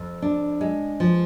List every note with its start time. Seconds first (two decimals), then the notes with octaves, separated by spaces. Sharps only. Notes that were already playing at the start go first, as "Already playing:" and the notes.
Already playing: F2
0.22 D4
0.61 G#3
1.00 F3